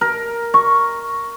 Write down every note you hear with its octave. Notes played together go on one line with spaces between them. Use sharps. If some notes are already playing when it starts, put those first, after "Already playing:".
A#4
C#6